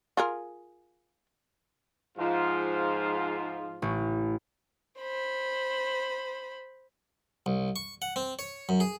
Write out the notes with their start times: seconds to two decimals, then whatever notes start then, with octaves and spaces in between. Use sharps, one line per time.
0.17 F4 G#4 A#4
2.18 G#2 F3 F4
3.82 A1
4.99 C5 B5
7.46 C2
7.76 C#6
8.02 F#5
8.16 C4
8.39 C#5
8.69 F#2
8.80 G#4